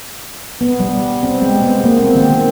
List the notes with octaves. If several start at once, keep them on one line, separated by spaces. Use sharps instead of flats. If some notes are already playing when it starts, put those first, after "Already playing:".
B3
G3
C4
G#3
B3
A#3
C4
D#3